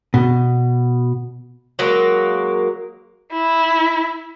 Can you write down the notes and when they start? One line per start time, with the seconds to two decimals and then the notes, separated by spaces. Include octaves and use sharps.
0.14 B2
1.79 F#3 G#3 A#3
3.33 E4